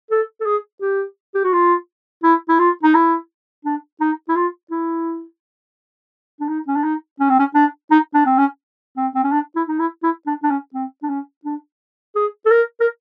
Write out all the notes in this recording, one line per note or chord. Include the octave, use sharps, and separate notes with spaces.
A4
A4
G#4
G4
G4
F#4
F4
E4
E4
F4
D#4
E4
D4
D#4
E4
F4
E4
D4
D#4
C#4
D4
D#4
C#4
C4
C#4
D4
D#4
D4
C4
C#4
C4
C4
C#4
D4
E4
D#4
E4
E4
D4
D4
C#4
C4
D4
C#4
D4
G#4
A4
A#4
A#4